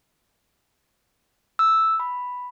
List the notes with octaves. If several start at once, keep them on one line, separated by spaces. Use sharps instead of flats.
E6
B5